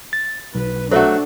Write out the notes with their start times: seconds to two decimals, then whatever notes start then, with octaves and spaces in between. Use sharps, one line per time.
0.13 A6
0.55 B1 B4
0.91 F#3 A3 D4 F#4 A4 C5 E5